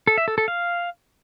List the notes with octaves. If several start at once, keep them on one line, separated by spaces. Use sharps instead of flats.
A4
E5
A4
A4
F5